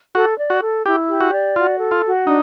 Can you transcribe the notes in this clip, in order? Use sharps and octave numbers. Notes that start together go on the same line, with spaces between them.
F#4 A4
D5
F#4
A4
E4 G4
G4
F#4
D5
F4 F#4
A4
F4
F#4
D4 D#4